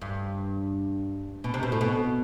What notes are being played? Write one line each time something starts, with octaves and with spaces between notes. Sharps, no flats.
G2
B2
C3
B2
A2
B2